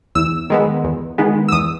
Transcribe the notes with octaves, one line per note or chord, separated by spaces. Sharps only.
E2 E6
D#3 G#3 B3
E2
D#3 G#3 B3
E6
E2 D#6